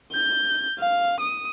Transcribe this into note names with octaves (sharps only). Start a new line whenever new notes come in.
G6
F5
D#6